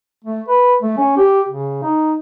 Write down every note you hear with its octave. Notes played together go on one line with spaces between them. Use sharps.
A3
B4
A3
C#4
G4
C#3
D#4